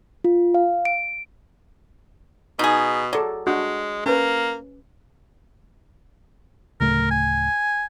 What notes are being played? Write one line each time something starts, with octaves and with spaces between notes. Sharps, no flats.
F4
F5
D7
B2 D#4 G#4
F#3 G#4 A4 D5
G#3 D4 F#4
A#3 C#4 B4
D1 C#3 A3 A#4
G#5